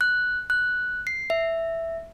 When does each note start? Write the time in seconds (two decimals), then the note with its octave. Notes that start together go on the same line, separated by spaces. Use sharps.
0.01 F#6
0.50 F#6
1.07 C7
1.30 E5